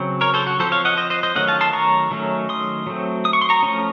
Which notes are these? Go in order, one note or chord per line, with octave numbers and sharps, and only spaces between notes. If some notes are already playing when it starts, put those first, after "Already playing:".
Already playing: C#3 F#3 C4
A#4 C#5
A4 C5
F#4
F3 C4 A4 C5
C#5 F5
D#5 F#5
C5 D#5
C5 D#5
C5 D#5
D#3 F#3 A3 C#4 D#5 F#5
F5 A5
A5 C6
A#5 C#6
D#3 F#3 A3 C#4
C6 D#6
F#3 A3 C4
D#6
C#6
C6
A#5 C#6
F3 A3 C#4